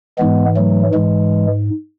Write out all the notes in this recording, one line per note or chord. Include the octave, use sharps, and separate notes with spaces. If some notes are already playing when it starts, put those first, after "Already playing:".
G#2 E3 G#3 B3
F#3 A3
G#2 E3 G#3